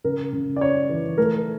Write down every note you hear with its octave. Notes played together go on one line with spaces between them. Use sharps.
C#3 A#4
C#3
D5
C#4 C#5
E3
A3 A#4